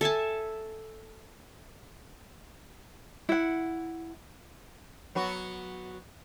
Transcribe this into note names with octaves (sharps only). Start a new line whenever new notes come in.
A4 E5 G#5 A5
E4 F#5
F#3 B3 F#4